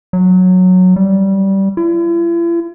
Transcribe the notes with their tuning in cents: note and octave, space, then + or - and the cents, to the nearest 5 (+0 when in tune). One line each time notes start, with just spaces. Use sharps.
F#3 -10
G3 -15
E4 +45